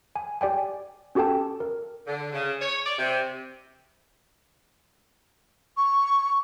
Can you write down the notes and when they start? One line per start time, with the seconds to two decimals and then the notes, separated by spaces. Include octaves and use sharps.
0.16 G#5
0.41 G4 D5 G5 G#5
1.15 C#4 F#4 G4 A4 G5 A5
1.60 A#4
2.07 D3
2.33 C#3
2.61 C#5
2.86 D5
2.98 C3
5.77 C#6